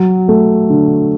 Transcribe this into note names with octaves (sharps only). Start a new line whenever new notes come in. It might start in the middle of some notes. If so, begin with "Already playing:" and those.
Already playing: F#3
A3
D3